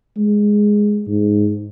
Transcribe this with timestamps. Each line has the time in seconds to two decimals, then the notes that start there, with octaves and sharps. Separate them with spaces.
0.17 G#3
1.07 G#2